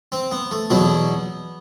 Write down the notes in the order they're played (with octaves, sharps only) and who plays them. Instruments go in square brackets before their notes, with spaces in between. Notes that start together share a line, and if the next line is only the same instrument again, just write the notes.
[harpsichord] C4
B3
A3
E2 B2 F#3 B3